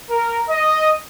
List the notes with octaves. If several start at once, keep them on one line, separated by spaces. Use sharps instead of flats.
A#4
D#5